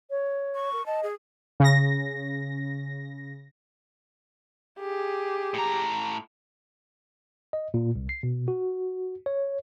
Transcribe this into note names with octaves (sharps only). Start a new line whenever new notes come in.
C#5
C#6
A#4
D#5 A5
G#4
C#3 A#6
G4 G#4
A2 A#5
D#5
A#2
C2
C7
B2
F#4
C#5